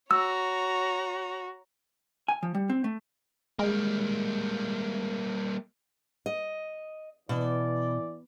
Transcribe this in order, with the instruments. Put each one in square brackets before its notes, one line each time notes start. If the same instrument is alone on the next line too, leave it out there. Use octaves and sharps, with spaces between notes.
[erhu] F#4 [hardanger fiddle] C#5 A#5 [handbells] E6
[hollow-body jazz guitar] G#5
F3
G3
C4
A3
[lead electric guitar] G3 A#3 [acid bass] G#3
[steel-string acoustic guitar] D#5
[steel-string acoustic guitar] B2 [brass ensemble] E3 D5